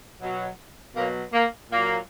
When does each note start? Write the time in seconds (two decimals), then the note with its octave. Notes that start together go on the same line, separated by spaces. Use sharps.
0.21 B2 F#3
0.96 B2 F#3 A#3
1.33 A#3
1.71 A#2 F#3 A#3